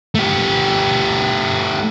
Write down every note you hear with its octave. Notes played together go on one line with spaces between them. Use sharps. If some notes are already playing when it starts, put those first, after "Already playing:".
A3 G4